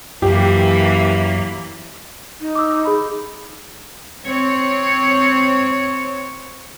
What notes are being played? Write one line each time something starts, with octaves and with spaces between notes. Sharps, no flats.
F#2 E3 A#3 G4
D#4
D6 E6
G#4 B5
C4 C#5